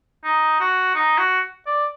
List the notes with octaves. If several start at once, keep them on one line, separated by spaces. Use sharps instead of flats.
D#4
F#4
D#4
F#4
D5